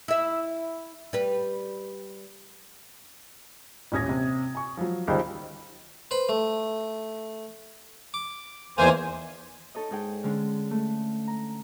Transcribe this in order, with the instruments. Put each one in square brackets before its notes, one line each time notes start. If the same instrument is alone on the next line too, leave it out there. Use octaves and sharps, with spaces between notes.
[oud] E4 E5
G3 B4
[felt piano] D#1 A1 C#4 D#6 G#6 A#6
C3
G#5 C#6
F3 F#3
C#2 D#3 G3 C5
[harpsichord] B4 C5 B5
A3
D6
[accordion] E2 C5 G#5 [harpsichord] D#3 E3 A#3
[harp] D#4 A4 C#5 D#5
G#2 D#4 G#4 G5
D3 G#3 C#4
A3
A#5